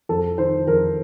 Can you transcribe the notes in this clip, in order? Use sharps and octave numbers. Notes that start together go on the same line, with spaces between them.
F2 A4
D#3 C5
F2 A#4